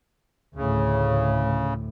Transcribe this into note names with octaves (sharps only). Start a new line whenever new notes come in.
D2 A2 C#3